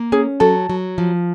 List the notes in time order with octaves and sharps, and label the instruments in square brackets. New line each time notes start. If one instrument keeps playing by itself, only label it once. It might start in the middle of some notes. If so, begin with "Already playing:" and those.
Already playing: [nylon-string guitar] A#3
[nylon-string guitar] C#4 [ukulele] G#4
[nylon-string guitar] F#3 [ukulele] A4
[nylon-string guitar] F#3
F3